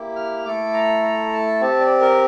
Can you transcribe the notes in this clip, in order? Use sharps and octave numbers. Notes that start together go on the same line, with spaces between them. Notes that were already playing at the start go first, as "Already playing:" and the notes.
Already playing: A#3 E4 G4
F6
A3 E4 A4 D6
A#5
A#5
A5
C4 G4 A5
D5
A#4